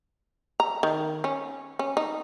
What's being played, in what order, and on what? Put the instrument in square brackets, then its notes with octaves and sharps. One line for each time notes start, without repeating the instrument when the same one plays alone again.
[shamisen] A#5
D#3
C#4
C#4
D#4